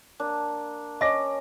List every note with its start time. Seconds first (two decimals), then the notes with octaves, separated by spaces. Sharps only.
0.20 A#3 D4
1.01 C#4 D#5 D6 A#6